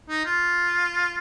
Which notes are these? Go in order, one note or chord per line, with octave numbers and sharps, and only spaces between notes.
D#4
F4